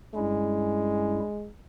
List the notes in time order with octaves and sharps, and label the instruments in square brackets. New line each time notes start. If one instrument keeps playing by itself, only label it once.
[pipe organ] G2 G3 C#4 E4 [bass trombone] G#3